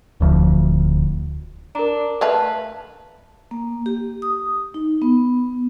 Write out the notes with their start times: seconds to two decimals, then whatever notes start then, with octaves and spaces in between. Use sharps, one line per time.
0.20 D1 D2 F3
1.75 D4 A#4 A#5
2.21 A3 B4 F5 A5
3.51 A#3
3.86 G4
4.22 D#6
4.74 D#4
5.02 B3